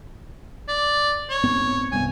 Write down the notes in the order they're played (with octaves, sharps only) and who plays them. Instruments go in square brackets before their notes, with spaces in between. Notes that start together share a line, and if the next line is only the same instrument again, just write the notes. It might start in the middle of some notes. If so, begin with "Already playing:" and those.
[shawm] D5
C#5
[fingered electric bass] G#2 B3 C4
[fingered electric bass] C2 G2 B3 [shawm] G#5